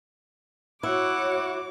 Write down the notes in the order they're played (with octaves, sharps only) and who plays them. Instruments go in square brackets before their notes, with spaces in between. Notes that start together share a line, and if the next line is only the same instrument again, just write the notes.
[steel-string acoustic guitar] E4 [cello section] F#4 C#5 [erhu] F#5 [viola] D6